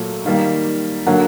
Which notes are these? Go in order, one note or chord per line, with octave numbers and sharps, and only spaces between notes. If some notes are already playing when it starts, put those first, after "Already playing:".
Already playing: A#2 F#3 A3
D#3 G3 A#3 F5
D3 F#3 A#3 F#5